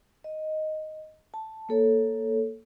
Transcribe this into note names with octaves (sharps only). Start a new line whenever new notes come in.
D#5
A5
A#3 A4 C#5